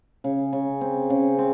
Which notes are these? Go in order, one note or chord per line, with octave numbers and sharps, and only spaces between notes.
C#3
C#3
C4
C#3
C4